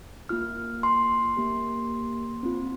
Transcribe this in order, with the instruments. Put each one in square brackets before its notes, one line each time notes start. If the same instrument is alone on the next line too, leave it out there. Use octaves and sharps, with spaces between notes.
[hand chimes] A#3 F4 F6
C6
A#3 G4
C4 F4